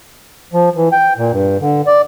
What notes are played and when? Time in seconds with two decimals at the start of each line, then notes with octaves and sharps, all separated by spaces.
0.53 F3
0.76 E3
0.92 G5
1.18 A#2
1.32 G2
1.60 D3
1.86 D5